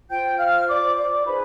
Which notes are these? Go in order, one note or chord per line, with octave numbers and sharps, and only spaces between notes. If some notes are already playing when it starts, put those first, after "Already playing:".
F4 C5 G5 G6
F5 F6
D5 D6
D5 D6
D#4 G#4 B4 C5 B5